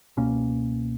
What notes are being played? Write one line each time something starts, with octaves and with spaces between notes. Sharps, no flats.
C#2 B2 A#3 C#4